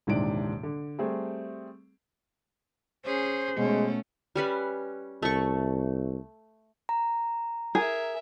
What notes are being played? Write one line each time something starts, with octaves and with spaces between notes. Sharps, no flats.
D#1 G#2 C3 E3 D4 D7
D3
G3 A3 C4 G#4
C#4 G#4 C5
B2 G#3 A3 C#4
G3 C#4 B4
C2 A3 C#6
A#5
G#4 A#4 E5